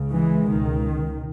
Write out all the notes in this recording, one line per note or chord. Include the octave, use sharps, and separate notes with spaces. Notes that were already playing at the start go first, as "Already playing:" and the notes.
Already playing: C#2 C#3
E3 G#3
C#2 B2 D#3